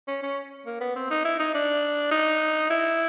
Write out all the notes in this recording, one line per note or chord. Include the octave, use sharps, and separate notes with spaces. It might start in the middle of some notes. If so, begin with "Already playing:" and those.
C#4
C#4
A#3
B3
C4
D#4
E4
D#4
D4
D#4
E4